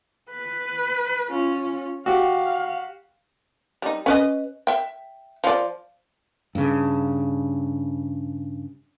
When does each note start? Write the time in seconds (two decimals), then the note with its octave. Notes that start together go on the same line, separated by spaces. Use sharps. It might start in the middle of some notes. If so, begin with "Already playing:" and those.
0.30 B4
1.30 C#4 F4
2.06 F#4 G4 F5
3.82 G3 D#4
4.06 C#4 B4 D#5
4.67 E5 G5
5.44 F3 D5
6.55 G2 C#3